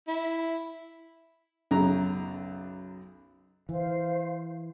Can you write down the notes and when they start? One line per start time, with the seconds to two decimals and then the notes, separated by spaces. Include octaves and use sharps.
0.08 E4
1.71 B1 F#2 C#3 F#3 A#5
3.69 E3 C5 F5